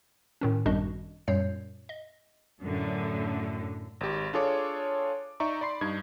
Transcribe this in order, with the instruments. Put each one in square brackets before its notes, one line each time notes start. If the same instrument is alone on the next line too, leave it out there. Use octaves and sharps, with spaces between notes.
[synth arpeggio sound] A2 D#3 C#4
G#1 F#2 G3 D4 F#4 D#5
F#2 A#2 G3 C#5 G6 C7
D#5
[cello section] F#2 A2 D3
[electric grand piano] G#1 G4
D4 F4 G#4 A4 C#5 D6
D#4 D5 E5 A#5 C#6
D5 B5 C6 C7
G2 D#4 G#6